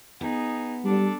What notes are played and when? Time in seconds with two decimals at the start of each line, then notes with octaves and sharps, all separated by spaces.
0.21 B3 D#4 G#4
0.85 G3 D4 A4